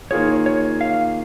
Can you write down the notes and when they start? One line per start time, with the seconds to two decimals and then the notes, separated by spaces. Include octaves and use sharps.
0.11 D#3 A#3 F4 G#4 C#5
0.46 C#5
0.81 F5